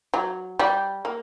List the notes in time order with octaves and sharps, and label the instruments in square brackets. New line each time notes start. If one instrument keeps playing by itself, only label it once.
[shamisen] F#3
G3
A#3